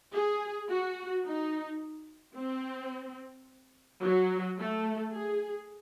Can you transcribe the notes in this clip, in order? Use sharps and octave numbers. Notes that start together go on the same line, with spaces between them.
G#4
F#4
D#4
C4
F#3
A3
G#4